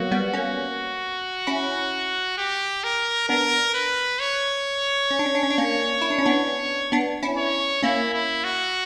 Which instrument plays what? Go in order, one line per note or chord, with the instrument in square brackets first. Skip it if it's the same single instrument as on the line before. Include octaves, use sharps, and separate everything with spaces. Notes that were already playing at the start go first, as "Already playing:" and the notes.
Already playing: [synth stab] F#3 A#3 B3 [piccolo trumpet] F#4
[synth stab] G3 B3
A#3 C#4
C#4 E4
[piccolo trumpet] G4
A#4
[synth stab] B3 D4 [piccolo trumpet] A#4
[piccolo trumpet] B4
C#5
[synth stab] C#4
D4
C#4
D4
C#4
D4
A#3 C#4
E4
D4
C#4
B3 D4
B3 D4
C#4 E4
[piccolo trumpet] C#5
[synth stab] A#3 C#4 [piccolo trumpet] E4
[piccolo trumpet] E4
F#4